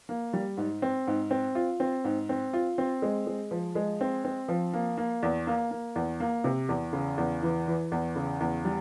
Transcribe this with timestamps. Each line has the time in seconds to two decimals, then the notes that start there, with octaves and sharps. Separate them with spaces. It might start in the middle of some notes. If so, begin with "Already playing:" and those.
0.09 A#3
0.33 G3
0.57 G#2
0.82 C4
1.07 G#2
1.31 C4
1.55 F4
1.80 C4
2.04 G#2
2.29 C4
2.53 F4
2.78 C4
3.02 G#3
3.27 G#3
3.51 F3
3.75 G#3
4.01 C4
4.25 C4
4.48 F3
4.74 A#3
4.98 A#3
5.23 E2
5.47 A#3
5.71 A#3
5.96 E2
6.20 A#3
6.44 C3
6.69 E2
6.93 C#3
7.18 E2
7.42 E3
7.67 E3
7.92 E2
8.16 C#3
8.40 E2
8.65 G3